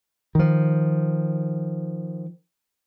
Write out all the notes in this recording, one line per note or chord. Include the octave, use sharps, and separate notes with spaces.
D#3 F3